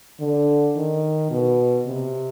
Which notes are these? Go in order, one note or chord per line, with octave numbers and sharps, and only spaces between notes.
D3
D#3
B2
C3